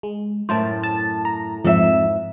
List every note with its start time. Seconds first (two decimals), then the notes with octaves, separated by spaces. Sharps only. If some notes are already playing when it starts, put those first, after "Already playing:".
0.03 G#3
0.49 F#2 A2 C5 A5
0.83 A5
1.25 A#5
1.64 F2 G#2 E5